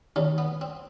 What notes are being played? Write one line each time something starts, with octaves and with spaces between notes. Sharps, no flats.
D#2 D#3 C#4
B3
C4